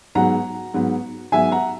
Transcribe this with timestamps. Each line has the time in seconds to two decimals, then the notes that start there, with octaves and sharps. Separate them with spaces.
0.15 G#2 F#3 B3 F#5 A#5
0.74 G#2 F#3 B3
1.32 G#2 F#3 B3 E5 G#5
1.51 F#5 A#5